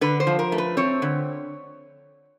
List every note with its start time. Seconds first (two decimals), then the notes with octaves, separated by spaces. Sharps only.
0.01 D3 B4
0.20 C5
0.27 F3
0.39 A#4
0.52 A3
0.58 B4
0.77 C4 C#5
1.02 D3